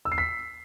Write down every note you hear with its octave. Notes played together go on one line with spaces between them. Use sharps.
E6
C7
B6